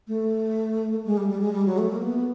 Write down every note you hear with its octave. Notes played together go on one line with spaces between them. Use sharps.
A3
G#3
G3
G3
G#3
G3
F#3
A3
A#3
B3